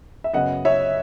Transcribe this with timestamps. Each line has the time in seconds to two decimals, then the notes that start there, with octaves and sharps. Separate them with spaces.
0.24 E5
0.34 F#2 C#3 F#3 B3 D#5 F#5
0.65 C#5 E5